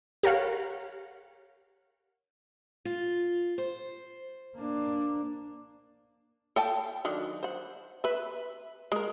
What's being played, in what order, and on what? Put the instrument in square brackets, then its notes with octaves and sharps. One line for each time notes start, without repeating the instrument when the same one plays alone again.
[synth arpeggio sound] G4 A#4 C#5 F5 F#5
[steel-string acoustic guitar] F4
C5
[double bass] A#3 D4
[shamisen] A4 G5 A5
D3 D#3 F#3
C5 F#5
B4 E5
G#3 A#4